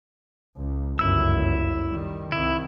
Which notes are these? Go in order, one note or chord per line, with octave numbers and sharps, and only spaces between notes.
C#2
G1 C#2 F#2 E4 E6
D#3 G3
C2 D#3 E4